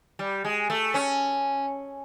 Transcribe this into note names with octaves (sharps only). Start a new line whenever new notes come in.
G3
G#3
A3
C#4